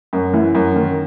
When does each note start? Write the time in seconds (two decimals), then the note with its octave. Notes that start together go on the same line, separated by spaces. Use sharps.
0.13 F#2
0.33 E3
0.55 F#2
0.76 D#3